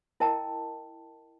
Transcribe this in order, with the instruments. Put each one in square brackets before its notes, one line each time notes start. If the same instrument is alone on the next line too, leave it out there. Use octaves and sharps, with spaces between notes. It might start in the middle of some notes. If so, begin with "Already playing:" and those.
[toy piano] E4 A#4 D#5 G5 A5